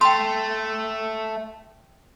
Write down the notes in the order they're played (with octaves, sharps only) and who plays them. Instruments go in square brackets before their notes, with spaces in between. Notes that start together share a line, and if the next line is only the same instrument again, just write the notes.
[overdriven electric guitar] A3 [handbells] G5 C6